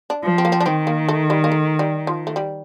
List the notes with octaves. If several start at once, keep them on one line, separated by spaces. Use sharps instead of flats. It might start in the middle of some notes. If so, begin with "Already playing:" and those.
D4
F3
C4
A#3
C4
D4
D#3 C4
A#3
A3
G3
A#3
A3
G3
F3
A3
G3